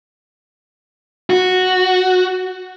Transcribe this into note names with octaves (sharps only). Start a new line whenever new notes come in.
F#4